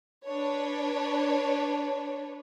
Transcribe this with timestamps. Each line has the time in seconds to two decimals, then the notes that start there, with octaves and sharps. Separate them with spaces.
0.25 D4 B4 C#5